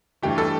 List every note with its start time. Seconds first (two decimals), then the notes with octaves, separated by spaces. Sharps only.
0.22 G2 E3 A3 G4
0.38 A4